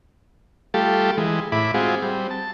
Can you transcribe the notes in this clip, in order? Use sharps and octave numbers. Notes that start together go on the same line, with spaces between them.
G3 A3 F4 G4 A4
E3 G#3
A2 E4 B5 D6
G#3 C4 F4 F#4 G#4
G3 C4
A5